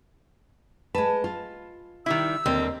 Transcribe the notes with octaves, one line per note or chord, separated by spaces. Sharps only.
G#3 B4 A5
F4
D#3 G3 E4 E6
D#2 D3 G3 C4